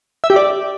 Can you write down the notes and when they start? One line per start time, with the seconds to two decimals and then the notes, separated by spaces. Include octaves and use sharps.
0.24 E5
0.30 G4
0.36 D5